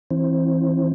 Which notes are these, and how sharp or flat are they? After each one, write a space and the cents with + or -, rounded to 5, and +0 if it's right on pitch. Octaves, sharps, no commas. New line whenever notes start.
E3 +0 C4 +20